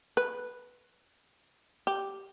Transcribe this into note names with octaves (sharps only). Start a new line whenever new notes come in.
B4
G4